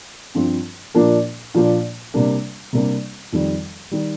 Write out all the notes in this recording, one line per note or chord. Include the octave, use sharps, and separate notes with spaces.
G2 F3 C4 F4
A#2 F3 A#3 D4
A#2 F3 A#3 D4
C3 G3 A#3 D4
C3 G3 A#3 D4
F2 D#3 G3
D#3 G3